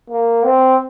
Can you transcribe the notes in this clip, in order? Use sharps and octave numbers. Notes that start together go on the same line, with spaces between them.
A#3
C4